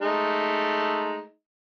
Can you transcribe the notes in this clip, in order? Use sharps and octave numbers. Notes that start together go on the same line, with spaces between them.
G#3 A3 D#4